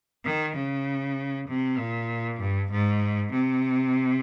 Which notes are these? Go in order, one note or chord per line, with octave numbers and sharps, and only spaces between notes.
D#3
C#3
C3
A#2
G2
G#2
C3